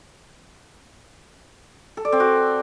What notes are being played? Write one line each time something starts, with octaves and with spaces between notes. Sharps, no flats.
A4
D5
C4
F#4